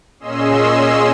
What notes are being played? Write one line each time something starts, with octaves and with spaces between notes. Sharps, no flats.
A#2 C#4 G#4 D#5 C6 E6